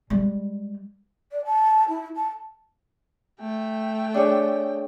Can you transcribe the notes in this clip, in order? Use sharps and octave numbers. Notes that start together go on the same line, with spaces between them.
G3 G#3
D5
A5
E4
A5
A3 G5
D4 G#4 C#5